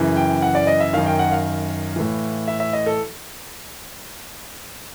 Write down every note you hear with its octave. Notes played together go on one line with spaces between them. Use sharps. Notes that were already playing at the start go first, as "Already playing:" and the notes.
Already playing: F#2 C#3 E3
G5
F#5
D5
D#5
E5
F#2 D#3 F5
G5
F#5
F5
A2 E3
E5
E5
D#5
A4